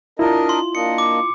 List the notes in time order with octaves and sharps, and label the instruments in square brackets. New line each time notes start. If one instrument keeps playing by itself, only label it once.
[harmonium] D4 A#4 D#5 [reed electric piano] E4 F4
[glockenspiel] C6
[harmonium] A#3 D4 D#5 [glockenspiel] C#7
[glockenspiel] D6